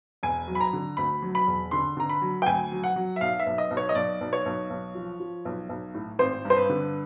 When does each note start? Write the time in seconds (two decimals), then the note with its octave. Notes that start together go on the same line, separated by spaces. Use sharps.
0.23 E1 G#5
0.48 F#3
0.55 B5
0.60 A#5
0.73 D3
0.97 D2 B5
1.22 F#3
1.35 B5
1.47 E1
1.71 D3 C6
1.97 D3 A#5
2.10 B5
2.22 F#3
2.42 G5
2.46 D2 G#5
2.72 F#3
2.84 F#5
2.96 F#3
3.16 E5
3.21 B1 F5
3.40 E5
3.47 B1
3.58 D#5
3.71 B1
3.77 C#5
3.89 D#5
3.95 B1 D5
4.21 B1
4.33 C#5
4.46 B1
4.70 B1
4.95 F3
5.20 F3
5.45 B1
5.69 B1
5.94 A2
6.19 G#1 C5
6.45 G2
6.50 C5
6.57 B4
6.69 D3